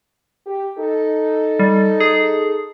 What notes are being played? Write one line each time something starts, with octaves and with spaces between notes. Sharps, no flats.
G4
D#4 A4
G3
G#4